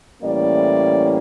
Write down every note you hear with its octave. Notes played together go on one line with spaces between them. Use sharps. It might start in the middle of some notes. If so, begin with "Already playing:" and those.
A2 E3 G3 A#3 C#4 D5